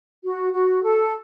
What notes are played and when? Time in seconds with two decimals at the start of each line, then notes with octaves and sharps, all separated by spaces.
0.23 F#4
0.52 F#4
0.82 A4